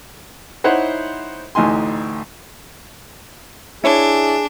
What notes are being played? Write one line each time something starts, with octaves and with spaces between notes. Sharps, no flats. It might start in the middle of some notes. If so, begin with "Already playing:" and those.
D#4 E4 C5 C#5 F#5
A1 D2 D#4 G#5 C6
D4 E4 G#4 C#5